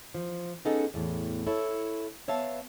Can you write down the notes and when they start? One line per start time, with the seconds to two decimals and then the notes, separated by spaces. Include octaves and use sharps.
0.14 F3
0.65 B3 C#4 D#4 G#4 A4 F#5
0.94 E2 A2
1.47 E4 A4 C#5
2.28 B3 C#5 E5 F5 A5